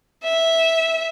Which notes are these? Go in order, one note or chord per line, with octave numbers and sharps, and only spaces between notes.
E5